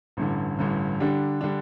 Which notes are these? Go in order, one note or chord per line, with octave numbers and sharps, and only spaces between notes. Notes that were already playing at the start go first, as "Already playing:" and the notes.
A1 G2 D3
A1 G2 D3
D3 G3 D4
D3 G3 D4